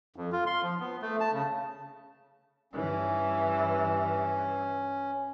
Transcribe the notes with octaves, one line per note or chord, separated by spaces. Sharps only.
F2
F4
C6
F3
B3
A3
A5
C#3
G2 E3 C#4